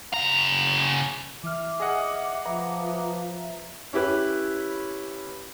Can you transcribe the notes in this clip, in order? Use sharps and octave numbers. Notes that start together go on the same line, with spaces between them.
C#3 A#5
E3 E5 D6 F6
G#4 D#5 F#5
F3 B4 E5 A#5
C#4 E4 G4 B4